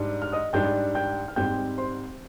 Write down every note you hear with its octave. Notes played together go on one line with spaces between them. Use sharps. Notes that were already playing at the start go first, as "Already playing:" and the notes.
Already playing: G#2 G3 D4
F6
D#5 D#6
G#2 G3 D4 G5 G6
G5 G6
F6
G#2 G3 C4 G5 G6
C5 C6